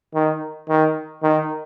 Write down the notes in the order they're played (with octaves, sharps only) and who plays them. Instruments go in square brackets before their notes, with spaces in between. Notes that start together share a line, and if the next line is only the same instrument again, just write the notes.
[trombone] D#3
D#3
D#3